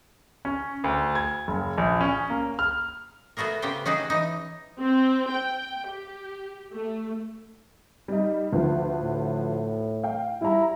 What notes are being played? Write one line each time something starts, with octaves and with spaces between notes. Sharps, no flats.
C#4
D2
G#6
F#1
A#1
C#4
A#3
F6
A3 B3 F#4 G#4 A#4
C#3 B3 C#4 G4 C5 G5
C#4 D#4 F#4 G#4 D5
E3 D#4
C4
G5
G4
A3
G3 D#4
D2 F3 B4
A2
F5 G5
G3 E4 A#5